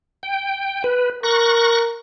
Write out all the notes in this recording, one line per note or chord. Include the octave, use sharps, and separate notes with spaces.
G5
B4
A#4 C#6 F#6 A#6